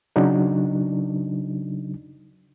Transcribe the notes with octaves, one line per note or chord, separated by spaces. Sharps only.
C#3 F#3 D4 D#4